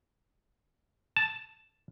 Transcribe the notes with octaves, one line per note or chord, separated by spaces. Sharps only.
A5